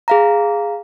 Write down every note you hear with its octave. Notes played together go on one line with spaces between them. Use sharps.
G#4 F5 A#5